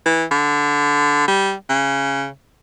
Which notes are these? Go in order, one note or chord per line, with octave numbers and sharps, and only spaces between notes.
E3
D3
G3
C#3